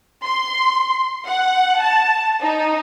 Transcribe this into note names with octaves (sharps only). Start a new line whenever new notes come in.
C6
F#5
A5
D#4